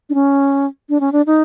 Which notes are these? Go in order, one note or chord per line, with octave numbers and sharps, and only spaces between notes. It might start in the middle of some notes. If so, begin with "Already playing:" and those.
D4
C#4
D4
C#4
D4
D#4